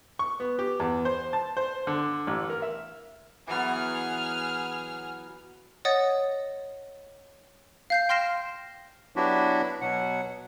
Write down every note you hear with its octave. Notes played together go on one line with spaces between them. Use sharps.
C#6
B3
G4
E2
C5
A5
C5
D3
A1
A#4
E5
E3 F#3 B3 G#4 F6
C#5 D#5 F#5 D#6 A6 C#7
F5 G6 C7
G5 C6 F6 A#6 C7 E7
F#3 B3 D4 E4 F#4 G4
B2 F#3 F#5